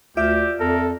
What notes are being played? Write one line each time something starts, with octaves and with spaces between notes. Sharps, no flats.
D2 F4 G4 D5 E5
F2 A4 A#4